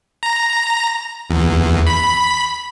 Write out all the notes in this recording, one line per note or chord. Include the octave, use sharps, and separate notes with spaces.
A#5
E2
B5